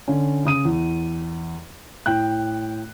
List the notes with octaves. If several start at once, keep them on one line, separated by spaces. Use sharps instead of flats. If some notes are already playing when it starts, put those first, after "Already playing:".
D3 C#4
C#3 D#6 D#7
E2
A2 G5 F#6